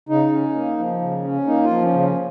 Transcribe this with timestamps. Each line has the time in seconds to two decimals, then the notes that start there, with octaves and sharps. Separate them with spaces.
0.09 C#3 D#4
0.32 C#4
0.55 A#3
0.78 F3
1.01 C#3
1.24 C#4
1.47 A#3 D#4
1.64 F4
1.70 F3
1.82 C#4
1.93 C#3
1.99 C#4